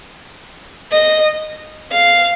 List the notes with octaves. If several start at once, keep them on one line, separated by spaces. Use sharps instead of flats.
D#5
F5